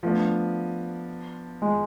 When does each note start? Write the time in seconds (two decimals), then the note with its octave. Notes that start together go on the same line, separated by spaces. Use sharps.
0.03 F3 A3 B3 D4
1.62 G#3